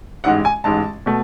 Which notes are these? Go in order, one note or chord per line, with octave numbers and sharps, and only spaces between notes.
A1 G#2 G#3 F#5
G#5
A1 G#2 G#3 A5
B2 A3